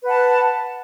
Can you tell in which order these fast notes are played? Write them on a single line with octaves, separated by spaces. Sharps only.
B4 F#5 A5